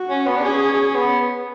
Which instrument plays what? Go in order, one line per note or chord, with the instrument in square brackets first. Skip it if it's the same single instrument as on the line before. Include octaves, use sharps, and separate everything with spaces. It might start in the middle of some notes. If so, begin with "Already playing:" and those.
Already playing: [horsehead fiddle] F#4
[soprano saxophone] C#4
B3
D4
[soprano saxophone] C#4 [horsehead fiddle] G#4
[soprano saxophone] B3